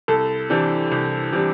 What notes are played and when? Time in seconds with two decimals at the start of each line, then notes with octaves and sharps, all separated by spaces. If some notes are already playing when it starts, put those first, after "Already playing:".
0.08 C2 A4
0.50 C3 E3 G3 D4
0.92 C2
1.32 C3 E3 G3 D4